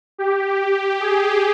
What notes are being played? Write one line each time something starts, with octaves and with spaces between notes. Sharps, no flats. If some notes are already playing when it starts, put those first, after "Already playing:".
G4
G#4